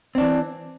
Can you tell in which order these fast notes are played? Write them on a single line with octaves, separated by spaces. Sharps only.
C4 D4 E3